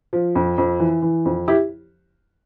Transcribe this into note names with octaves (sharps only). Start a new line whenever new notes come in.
F3
F2
F2
E3
E3
F2
E4 G4